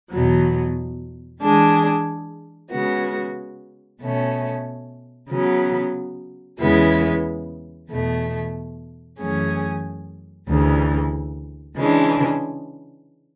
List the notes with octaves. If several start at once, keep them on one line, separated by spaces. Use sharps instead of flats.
E2 B2 F#3
E3 G#3 D4 G#4
C#3 G#3 B3 F#4
B2 A3 C#4
C#3 F#3 B3
E2 C#3 G#3 B3 E4
E2 B2 A3
F#2 E3 A3 C#4 G#4
D2 C#3 E3
C#3 E3 G#3 D4